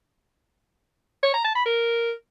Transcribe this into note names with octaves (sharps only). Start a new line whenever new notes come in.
C#5
A#5
A5
B5
A#4